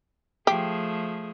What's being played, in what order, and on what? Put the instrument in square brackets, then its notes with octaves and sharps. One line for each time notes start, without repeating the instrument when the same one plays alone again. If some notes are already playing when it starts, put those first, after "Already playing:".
[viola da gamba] F3 A3 G#4 [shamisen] G4